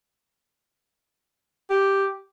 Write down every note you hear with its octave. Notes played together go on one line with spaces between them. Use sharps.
G4